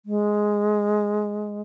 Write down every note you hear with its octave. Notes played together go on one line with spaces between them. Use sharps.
G#3